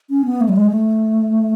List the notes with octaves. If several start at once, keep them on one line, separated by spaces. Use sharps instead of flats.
C#4
B3
A3
F#3
G#3
A3